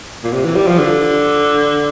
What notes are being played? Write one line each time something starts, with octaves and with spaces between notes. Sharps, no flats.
A#2
C3
E3
G3
F3
D3